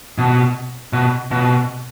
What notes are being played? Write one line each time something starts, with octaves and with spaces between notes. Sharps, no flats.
B2
B2
B2